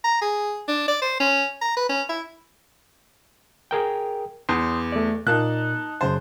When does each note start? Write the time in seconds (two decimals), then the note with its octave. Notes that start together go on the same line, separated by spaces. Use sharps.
0.04 A#5
0.21 G#4
0.68 D4
0.88 D5
1.02 C5
1.20 C#4
1.61 A#5
1.77 B4
1.89 C#4
2.09 E4
3.71 G#4 A#4 G5
4.49 E2 C6 D#6 G6
4.92 A3 D5
5.27 A#2 A#3 D#4 A5 F#6
6.01 F#2 C#3 C5 A5